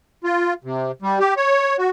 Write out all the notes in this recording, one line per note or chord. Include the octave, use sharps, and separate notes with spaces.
F4
C3
G3
G4
C#5
F#4